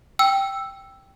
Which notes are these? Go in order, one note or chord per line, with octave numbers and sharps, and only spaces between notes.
G5 E6